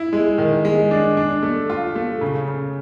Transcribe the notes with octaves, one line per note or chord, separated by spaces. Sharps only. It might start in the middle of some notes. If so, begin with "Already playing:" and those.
Already playing: E4
G#3
D#3
G#3
D4
D4
A3
F4
A3
C#3
C#3